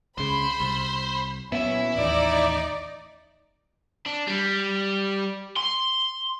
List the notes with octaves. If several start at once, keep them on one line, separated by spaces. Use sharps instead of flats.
C#2 C#3 C5 B5
C2
A#2 F#3 B3 C#4 E4 E5
A1 D#2 D#4 D5
D4
G3
C6